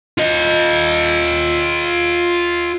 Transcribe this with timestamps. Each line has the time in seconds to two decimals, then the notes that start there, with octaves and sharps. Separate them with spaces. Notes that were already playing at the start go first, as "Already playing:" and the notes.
0.18 F4 D#5